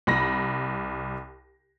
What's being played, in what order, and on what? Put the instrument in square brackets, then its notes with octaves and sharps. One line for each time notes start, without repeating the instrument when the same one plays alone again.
[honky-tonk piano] C2 B5 A#6